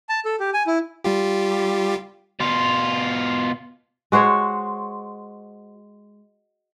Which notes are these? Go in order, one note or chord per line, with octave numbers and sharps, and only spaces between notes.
A5
A4
G4
G#5
E4
G3 F4 G4
B2 F4
G#3 F#4 C5 C#5